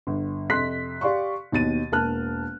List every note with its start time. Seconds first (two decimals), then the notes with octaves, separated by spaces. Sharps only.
0.07 G1
0.50 F2 C3 C6 F#6 B6
1.01 G4 D5 F5 C6 C#6
1.52 D#2 B2 A6 D#7
1.92 E1 A#3 A5 F6 F#6